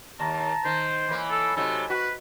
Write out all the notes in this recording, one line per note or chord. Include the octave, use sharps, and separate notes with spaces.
D#2 A5 A#5
D#3 C5
E3 A#3 C#5 G#5 B5
A4
C3 F#3 D#4 A4
F#4 B4